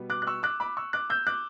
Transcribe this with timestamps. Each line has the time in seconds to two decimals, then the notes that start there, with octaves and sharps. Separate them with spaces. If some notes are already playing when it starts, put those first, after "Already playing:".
Already playing: B2 G3 B3
0.10 D6 F#6
0.22 F#6
0.27 C#6 E6
0.43 D6 F#6
0.60 B5 D6
0.77 C#6 E6
0.93 D6 F#6
1.10 E6 G6
1.27 D6 F#6